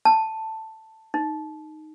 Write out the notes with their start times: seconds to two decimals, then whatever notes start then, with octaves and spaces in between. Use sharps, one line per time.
0.05 A5
1.14 D#4